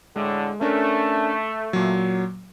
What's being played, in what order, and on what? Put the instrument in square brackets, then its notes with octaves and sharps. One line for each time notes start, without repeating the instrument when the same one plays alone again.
[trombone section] A2 D3 [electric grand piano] G#3
[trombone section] A3 [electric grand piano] C#4 D4 A#4
[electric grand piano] A#2 F#3